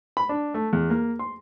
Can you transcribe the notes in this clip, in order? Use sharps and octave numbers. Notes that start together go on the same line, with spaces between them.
B5
D4
A3
E2
A#3
C6